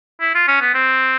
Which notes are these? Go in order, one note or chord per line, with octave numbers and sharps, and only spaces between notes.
E4
F4
C#4
B3
C4